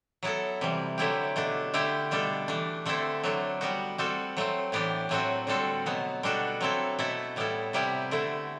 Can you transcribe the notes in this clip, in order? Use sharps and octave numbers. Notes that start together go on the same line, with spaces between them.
F#3 B3 E4 A4
C3 E3 G3
D3 F#3 A3 E4 G4
B2 A3 D4
D3 A3 E4 G4
B2 G3 D4 A4
E3 A3 D4
D3 A3 C4 E4 A4
F#3 A3 D4
G3 B3 F#4
G3 C4 F#4 A4
F#3 A3 C4
A2 E3 B3 D4 G4
A2 F#3 A3 C4 F#4
D3 G3 C4 F#4 A4
B2 F#3 B3
B2 G3 D4 F#4 A4
F#3 C4 E4 A4
B2 A3 E4 A4
A2 G3 B3 E4 A4
C3 G3 B3 E4 G4
D3 A3 E4